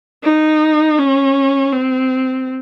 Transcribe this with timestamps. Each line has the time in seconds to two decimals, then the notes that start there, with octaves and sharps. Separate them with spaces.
0.24 D#4
0.98 C#4
1.72 C4